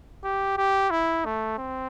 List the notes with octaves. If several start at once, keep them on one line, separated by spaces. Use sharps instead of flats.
G4
G4
E4
A3
C4